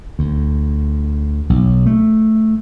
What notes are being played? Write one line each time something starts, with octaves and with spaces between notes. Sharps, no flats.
D2
B1
A3